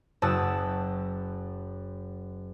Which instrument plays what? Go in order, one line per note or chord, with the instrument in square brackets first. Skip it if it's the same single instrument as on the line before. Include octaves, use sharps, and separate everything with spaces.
[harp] F#1 F#2 A5 D#6 E6